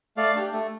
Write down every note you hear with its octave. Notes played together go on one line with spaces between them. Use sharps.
A3 D5 F5
D4 G4
A3